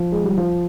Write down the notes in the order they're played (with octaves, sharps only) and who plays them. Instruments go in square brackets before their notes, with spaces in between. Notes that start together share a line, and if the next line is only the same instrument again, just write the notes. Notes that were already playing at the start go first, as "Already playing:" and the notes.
Already playing: [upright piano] F3
G#3
G3
F3